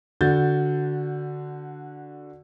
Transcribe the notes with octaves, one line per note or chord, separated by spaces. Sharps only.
D3 F#4 G6 A6